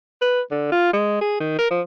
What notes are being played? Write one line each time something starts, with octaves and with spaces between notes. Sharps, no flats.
B4
D3
F4
G#3
G#4
D#3
A#4
F3